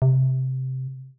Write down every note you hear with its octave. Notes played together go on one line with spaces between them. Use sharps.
C3